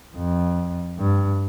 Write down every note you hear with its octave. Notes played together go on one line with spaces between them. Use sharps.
F2
G2